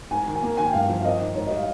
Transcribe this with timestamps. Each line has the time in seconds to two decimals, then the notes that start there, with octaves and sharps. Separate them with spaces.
0.11 G#2 G#5
0.26 D#3
0.35 G#5
0.42 A#3
0.57 D#3 G#5
0.66 G5
0.73 G2 F5
0.89 F3
1.00 F5
1.05 C4 D#5
1.20 D#3
1.35 G#2 C#5
1.47 D#5
1.51 G3
1.57 F5